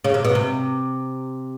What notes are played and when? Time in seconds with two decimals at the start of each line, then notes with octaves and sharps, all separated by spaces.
0.04 C#3
0.14 C3
0.24 B2
0.35 C3